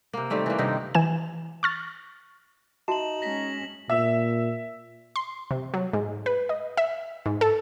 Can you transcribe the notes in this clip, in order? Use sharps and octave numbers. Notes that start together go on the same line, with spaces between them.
C3 A#3
D#3 G3 A3 C4
E3 A#3
G2 C3 D#3 D#4
E3 G#5 E7
C#6 F6 A6
D#4 F#4 E5 A5 E7 F#7
G#3 C#4 A#6 B6 F#7
A#2 E5
C6
C3
F#3
G#2
B4
D#5
E5
G#2
A4